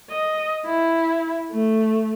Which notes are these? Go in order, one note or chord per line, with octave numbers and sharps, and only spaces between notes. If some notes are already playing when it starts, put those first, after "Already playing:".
D#5
E4
A3